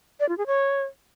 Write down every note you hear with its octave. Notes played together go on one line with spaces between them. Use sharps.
D5
F4
G#4
C#5